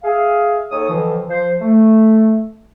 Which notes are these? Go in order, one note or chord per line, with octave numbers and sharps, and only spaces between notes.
G#4 E5 F5
D#2 A4 C#5 D#6
F2 D3 E3 F3
F3 C5
A3